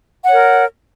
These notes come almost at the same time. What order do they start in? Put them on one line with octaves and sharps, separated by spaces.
F#5 C#5 A#4